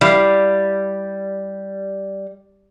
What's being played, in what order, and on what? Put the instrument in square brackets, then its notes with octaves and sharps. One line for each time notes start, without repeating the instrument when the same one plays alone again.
[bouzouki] G3 [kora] E4 G4 F5